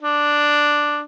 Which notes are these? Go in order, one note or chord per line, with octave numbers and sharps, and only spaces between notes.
D4